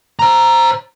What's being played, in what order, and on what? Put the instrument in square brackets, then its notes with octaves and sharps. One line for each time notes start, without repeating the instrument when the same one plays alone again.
[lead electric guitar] C5 A#5